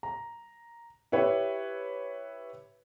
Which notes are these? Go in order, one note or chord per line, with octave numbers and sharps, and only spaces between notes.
A#5
E4 G4 B4 C#5